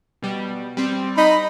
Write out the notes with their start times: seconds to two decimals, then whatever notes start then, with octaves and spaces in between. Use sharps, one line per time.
0.22 B2 G3
0.77 G3 C4
1.16 D#4 D#5 B5